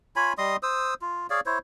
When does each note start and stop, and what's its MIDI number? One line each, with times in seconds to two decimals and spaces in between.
0.16 0.33 65
0.16 0.33 73
0.16 0.33 80
0.16 0.33 83
0.38 0.56 55
0.38 0.56 75
0.38 0.56 84
0.38 0.56 87
0.63 0.94 72
0.63 0.94 87
0.63 0.94 88
1.01 1.27 65
1.30 1.40 68
1.30 1.40 73
1.30 1.40 74
1.30 1.40 77
1.46 1.59 64
1.46 1.59 72
1.46 1.59 73